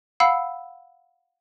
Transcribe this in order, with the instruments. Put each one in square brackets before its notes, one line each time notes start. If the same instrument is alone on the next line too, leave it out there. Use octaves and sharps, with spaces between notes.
[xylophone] F5 F#5 B5 E6 C7